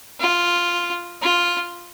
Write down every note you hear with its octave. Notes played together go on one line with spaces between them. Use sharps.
F4
F4